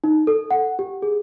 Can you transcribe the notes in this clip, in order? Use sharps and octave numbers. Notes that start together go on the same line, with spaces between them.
D#4
A4
F#5
G4
G#4